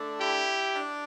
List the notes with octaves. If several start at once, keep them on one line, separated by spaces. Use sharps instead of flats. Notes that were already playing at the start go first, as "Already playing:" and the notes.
Already playing: D3 A3 D4
E4 G4
D4